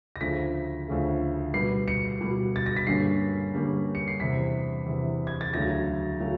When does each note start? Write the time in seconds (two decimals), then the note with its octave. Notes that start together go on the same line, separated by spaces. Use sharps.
0.16 A#6
0.21 D2 C#3 F3 A3 B6
0.88 D2 C#3 F3 A3
1.54 B2 G3 B3 C7
1.88 C#7
2.21 B2 G3 B3
2.56 A6
2.66 A#6
2.77 B6
2.87 G2 D3 G3 A#3 C#4 C7
3.53 G2 D3 G3 A#3 C#4
3.95 C#7
4.08 C7
4.20 E2 C3 E3 B6
4.86 E2 C3 E3
5.27 G#6
5.41 A6
5.54 D2 C#3 F#3 A3 A#6
6.20 C#3 F#3 A3